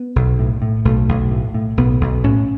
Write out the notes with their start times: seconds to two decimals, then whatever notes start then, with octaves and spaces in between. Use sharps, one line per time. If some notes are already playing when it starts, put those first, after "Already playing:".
Already playing: B3
0.16 B1
0.39 A2
0.62 A2
0.85 B1 A3
1.09 B1
1.31 A2
1.54 A2
1.77 B1 B3
2.01 B1
2.24 A2 C#4